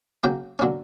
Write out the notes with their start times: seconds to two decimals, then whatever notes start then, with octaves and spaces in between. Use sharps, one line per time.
0.23 C#3 F#3 A#3 G5
0.59 D3 F#3 A#3 C#4